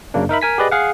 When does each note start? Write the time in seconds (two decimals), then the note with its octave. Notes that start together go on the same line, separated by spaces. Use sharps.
0.14 F#2 C#3 A#3 D4
0.29 D#4 A#4 E5 B5
0.42 A#4 G#5 B6
0.58 G4 G#4 B4 D5 D#5
0.71 G#4 F5 F#5